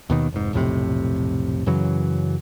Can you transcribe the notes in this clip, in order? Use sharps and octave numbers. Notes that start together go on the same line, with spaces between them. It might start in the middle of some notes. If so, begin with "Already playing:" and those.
D#2 B2 D#3
F1 G#2
B1 F2 A2 C3
F#2 C#3 E3 F#3